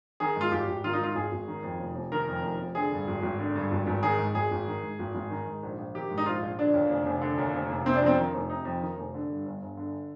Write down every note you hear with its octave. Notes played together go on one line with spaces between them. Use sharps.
D#3 G#4
G#2 F4
G#1 G4
G#1
D#3 F4
D#4
G#2 F4
G#1 G#4
G#1
D#3
F2
F1
F1
D#3 A#4
F2
F1
F1
D3 G#4
G2
G#1
G#1
D3
G2
G#1
G#1
D#3 G#4
G#2
G#1 G#4
G#1
D#3
G#2
G#1
G#1
D#3
G#2
A#1
A#1
D#3 G4
G#2
D#4
A#1 F4
A#1
D3 D4
D#2
F1
F1
D3
D#2
F1
F1
C3 C4
D4
F2 C4
D#3
F1
C3 D#4
F2
D#3
F1
D3
G2
G1
G1
D3